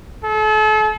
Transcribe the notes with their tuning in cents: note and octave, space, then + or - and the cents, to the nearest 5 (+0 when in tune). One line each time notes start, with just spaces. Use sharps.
A4 -40